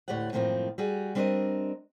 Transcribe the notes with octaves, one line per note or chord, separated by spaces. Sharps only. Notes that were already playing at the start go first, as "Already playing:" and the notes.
D2 A2 G4 C#5 D5 F#5
F#2 A2 D#3 F3 A#3 C4
G3 F#4 G#4
G3 C4 D4 A#4 C#5 D#5